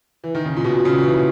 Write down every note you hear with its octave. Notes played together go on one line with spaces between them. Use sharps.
E3
D#3
C#3
A#2
B2
C#3
E3